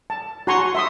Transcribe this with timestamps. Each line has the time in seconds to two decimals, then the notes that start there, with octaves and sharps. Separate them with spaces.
0.10 A5
0.47 F#4 F#5 G#5 A#5 C6 C#6
0.75 E5 C6 D#6